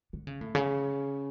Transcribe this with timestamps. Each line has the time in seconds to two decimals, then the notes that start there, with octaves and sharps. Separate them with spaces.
0.13 D3
0.27 C#3
0.41 A2
0.55 C#3